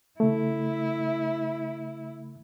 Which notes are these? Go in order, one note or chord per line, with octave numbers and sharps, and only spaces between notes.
C#3 A3 E4